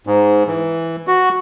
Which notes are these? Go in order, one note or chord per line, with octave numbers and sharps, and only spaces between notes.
G#2
E3
F#4